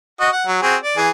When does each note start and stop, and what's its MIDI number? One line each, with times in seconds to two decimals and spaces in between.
0.20 0.29 66
0.20 0.29 75
0.33 0.45 78
0.47 0.62 54
0.62 0.76 60
0.62 0.76 66
0.62 0.76 68
0.83 0.97 74
0.97 1.10 52
0.97 1.10 68